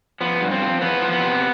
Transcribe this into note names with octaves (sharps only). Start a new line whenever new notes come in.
F3 B3
G2
C4
F3
E2 B3
F3
B3
C3